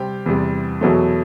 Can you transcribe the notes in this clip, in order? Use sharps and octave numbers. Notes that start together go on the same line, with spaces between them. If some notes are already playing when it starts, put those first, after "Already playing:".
Already playing: C3 G3 C4 G4
E2 C3 G3
E2 B2 F#3 A3